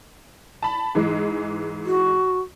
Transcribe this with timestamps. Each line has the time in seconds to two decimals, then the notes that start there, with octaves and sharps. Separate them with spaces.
0.63 A5 B5
0.95 G#2 E3 G#3
1.85 F#4